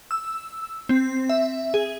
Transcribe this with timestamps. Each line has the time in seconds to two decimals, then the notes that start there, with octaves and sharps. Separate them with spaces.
0.11 E6
0.89 C4
1.29 E5
1.74 G#4